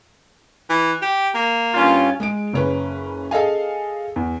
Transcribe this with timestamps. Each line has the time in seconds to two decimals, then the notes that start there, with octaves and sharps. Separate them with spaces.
0.70 E3
1.02 G4
1.35 A#3
1.74 G2 C#4 F4
2.20 G#3 G#4 D7
2.53 F#1 C#4 B4
3.31 G#4 A4 D#5 F5 G#5
4.16 E2